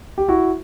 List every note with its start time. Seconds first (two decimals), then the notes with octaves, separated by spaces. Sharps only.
0.18 G4
0.28 E4 F#4